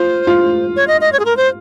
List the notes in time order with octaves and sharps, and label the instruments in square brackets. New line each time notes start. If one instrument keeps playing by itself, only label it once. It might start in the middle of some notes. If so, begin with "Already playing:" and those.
Already playing: [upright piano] F4 [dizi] C5
[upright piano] F4
[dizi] C#5
D#5
D#5
C#5
G#4
A#4
C5